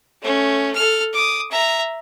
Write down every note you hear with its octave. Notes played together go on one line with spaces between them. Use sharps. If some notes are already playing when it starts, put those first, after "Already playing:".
A3 C#4
A4 F6
D6 D#6
E5 A#5